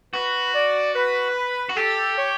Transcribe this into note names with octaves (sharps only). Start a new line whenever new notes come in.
F#4 B4
D5
B4
F#4
G4 A4
C#5